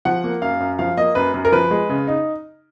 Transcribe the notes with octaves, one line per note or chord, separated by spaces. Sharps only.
F3 F#5
A#3
F#2 F5
F#2
F3 F5
A#3 D#5
F#2 B4
F#2
A#4
F3 B4
G#3
C#3
D#4